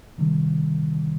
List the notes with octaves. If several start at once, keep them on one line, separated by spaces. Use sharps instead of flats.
C3 D#3 G3